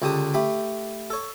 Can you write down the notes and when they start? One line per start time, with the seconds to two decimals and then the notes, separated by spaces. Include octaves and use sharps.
0.02 C#2 D3 G4 A5 D#6
0.34 A3 G4 B5
1.10 A4 C#5